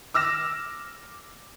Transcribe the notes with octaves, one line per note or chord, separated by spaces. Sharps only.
D6 E6 F6 A#6 E7